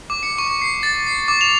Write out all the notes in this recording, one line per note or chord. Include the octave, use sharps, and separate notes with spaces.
D6
C#7
C#6
C7
A6
C7
D6
F7